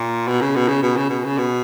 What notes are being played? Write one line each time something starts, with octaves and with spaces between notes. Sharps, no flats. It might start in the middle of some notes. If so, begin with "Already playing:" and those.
Already playing: A#2
B2
C#3
B2
C#3
B2
C#3
B2
C#3
B2